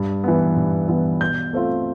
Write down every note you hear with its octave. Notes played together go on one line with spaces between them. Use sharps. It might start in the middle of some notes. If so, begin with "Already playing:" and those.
Already playing: G2
E3 B3
G2
E3 B3
B2 G6
A3 C4 F4